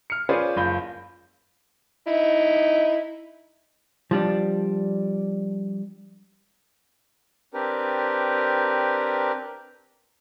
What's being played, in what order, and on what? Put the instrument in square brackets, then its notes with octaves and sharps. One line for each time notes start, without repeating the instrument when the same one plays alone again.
[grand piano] F6 C#7
C#4 F4 G#4 B4 C5 D5
F#1 F4 B5 G6
[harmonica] D#4 E4
[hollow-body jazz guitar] F3 G3 D4
[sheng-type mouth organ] C4 D4 G4 A#4 B4